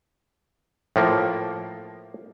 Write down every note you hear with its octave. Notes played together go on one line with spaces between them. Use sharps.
A2 F3 A#3